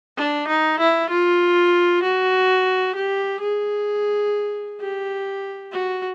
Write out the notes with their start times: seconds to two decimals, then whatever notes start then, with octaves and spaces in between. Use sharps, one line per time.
0.17 D4
0.48 D#4
0.80 E4
1.10 F4
2.03 F#4
2.96 G4
3.41 G#4
4.80 G4
5.72 F#4